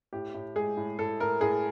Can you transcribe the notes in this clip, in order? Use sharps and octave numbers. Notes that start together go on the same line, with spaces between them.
A2 G4
A2
G#3 G#4
A2
A2 A4
A2 A#4
A2 G#4